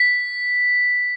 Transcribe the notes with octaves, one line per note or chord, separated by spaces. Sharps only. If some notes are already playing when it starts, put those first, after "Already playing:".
Already playing: B6